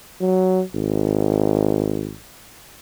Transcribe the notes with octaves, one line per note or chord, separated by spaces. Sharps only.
F#3
G#1